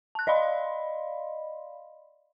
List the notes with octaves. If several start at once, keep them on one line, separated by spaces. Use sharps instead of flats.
A5 F#6
D5 D#5 F5 B5 C6